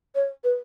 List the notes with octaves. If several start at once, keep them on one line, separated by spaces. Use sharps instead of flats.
C#5
B4